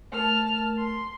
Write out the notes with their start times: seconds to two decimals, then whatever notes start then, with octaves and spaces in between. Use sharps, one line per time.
0.12 A3 A#4 A5 F6
0.79 C6